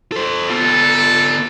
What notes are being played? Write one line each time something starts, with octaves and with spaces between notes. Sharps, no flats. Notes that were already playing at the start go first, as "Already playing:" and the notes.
A4 C5
B3 F4 A4